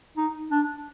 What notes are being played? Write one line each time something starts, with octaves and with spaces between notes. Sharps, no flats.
D#4
D4